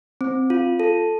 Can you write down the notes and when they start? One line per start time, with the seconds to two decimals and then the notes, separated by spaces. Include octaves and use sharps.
0.21 C4
0.50 F4
0.80 A4